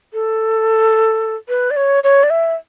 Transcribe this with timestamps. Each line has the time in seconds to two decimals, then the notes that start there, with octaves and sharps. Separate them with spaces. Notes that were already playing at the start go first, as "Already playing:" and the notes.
0.13 A4
1.49 B4
1.71 D5
1.76 C#5
2.04 C#5
2.23 D5
2.30 E5